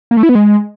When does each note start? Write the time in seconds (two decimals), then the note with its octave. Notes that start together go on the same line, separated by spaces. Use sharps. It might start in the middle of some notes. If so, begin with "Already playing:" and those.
0.11 A#3
0.17 A3
0.23 E4
0.29 B3
0.35 G#3